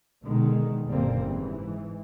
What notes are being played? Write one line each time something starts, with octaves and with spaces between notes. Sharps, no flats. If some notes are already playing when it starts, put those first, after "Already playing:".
B2 D3 D#3 G#3
F#1 A#2 D3 G3 A#3 C4
G#2 E3